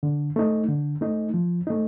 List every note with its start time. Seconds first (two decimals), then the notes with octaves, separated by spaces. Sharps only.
0.03 D3
0.36 A3 D#4
0.68 D3
1.01 A3 D#4
1.34 F3
1.67 A3 D#4